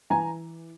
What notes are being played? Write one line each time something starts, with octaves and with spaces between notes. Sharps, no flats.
E3 G#5 A#5